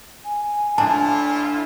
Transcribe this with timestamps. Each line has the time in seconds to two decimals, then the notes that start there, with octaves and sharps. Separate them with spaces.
0.25 G#5
0.78 A2 D4 E4 F4 A5